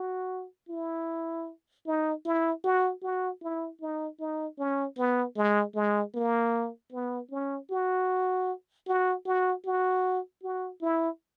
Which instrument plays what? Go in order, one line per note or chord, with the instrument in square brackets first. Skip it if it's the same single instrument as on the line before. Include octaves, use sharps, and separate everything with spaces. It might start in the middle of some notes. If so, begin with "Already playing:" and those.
Already playing: [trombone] F#4
E4
D#4
E4
F#4
F#4
E4
D#4
D#4
C#4
B3
G#3
G#3
A#3
B3
C#4
F#4
F#4
F#4
F#4
F#4
E4